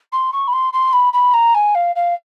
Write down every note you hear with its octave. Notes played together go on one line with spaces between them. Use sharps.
C6
C#6
B5
C6
C6
B5
B5
A#5
G#5
F5
F5